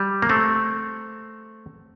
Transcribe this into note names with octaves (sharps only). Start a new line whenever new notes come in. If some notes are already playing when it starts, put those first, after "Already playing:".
Already playing: G3
A#3
A3 C4